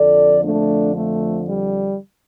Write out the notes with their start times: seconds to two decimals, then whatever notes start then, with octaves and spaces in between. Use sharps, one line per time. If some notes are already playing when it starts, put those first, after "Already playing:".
Already playing: F2 D3 F3 A4 D5
0.43 A3 D4
0.95 A3
1.48 G3